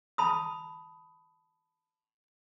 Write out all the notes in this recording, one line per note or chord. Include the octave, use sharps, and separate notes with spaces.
A5 B5 D#6